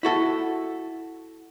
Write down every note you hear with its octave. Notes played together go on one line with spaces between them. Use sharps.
E4 F#4 A4